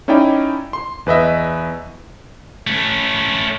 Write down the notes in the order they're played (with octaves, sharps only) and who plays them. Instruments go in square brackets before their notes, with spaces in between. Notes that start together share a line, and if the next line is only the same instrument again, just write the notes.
[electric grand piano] C#4 D#4 E4 D5 G5
C6
E2 B4 D#5 E5
[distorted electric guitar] A3 C#4